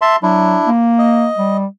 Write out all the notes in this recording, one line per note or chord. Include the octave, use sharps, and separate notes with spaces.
E5 A5 C6
F#3 D4 E4
A#3
D#5
G3